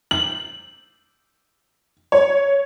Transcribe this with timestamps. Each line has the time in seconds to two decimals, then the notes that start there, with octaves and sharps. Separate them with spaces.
0.11 F#7
2.12 C#5